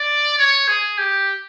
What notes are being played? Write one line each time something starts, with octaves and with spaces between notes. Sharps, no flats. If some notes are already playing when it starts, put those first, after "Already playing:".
Already playing: D5
C#5
G#4
G4